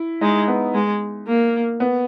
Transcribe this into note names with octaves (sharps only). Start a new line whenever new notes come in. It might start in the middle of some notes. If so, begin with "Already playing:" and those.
Already playing: E4
G#3 D#4
B3
G#3
A#3
B3